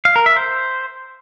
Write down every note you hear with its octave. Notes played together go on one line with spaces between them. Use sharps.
F5
A#4
E5
C5